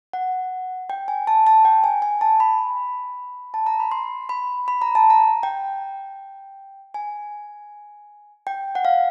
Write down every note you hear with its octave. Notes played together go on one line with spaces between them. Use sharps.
F#5
G5
G#5
A5
A5
G5
G#5
G#5
A5
B5
A5
A#5
B5
C6
B5
B5
A#5
A5
A#5
G5
G#5
G5
F#5
F5